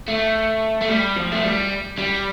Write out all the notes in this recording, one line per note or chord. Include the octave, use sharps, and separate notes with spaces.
A3
A3
G3
F3
A3
G3
G3